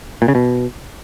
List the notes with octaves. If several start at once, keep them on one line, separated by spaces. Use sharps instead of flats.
A#2
C#3
B2